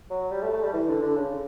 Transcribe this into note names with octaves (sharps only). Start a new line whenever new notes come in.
F#3
G3
A3
A3
G3
E3
D3
D3
C#3